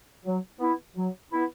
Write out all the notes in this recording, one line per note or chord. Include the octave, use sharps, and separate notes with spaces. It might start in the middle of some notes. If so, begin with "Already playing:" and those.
F#3
B3 E4
F#3
B3 E4